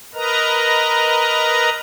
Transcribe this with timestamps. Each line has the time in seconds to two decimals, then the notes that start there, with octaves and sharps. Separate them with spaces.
0.14 A#4 B4 D#5 A#5